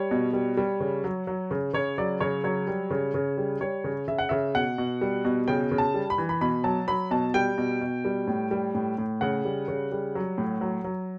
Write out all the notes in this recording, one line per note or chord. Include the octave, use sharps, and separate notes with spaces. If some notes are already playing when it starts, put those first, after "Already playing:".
Already playing: G3 C#5
B2
G3
G3
C#3
F#3
F#3
C#3
C#3 C#5
F#3 D5
C#3 C#5
F#3 C#5
G3
C#3
C#3
G3
G3 C#5
C#3
C#3 E5
F#5
C#3 E5
B2 F#5
B2
G3
B2
C#3 G5
C#3
A5
G3
B5
E3
B5
B2 B5
F#3 A5
F#3 B5
B2 A5
G3 G5
B2
B2
G3
A2
G3
A2
A2
C#3 F#5
G3
C#3
G3
F#3
A2
F#3
F#3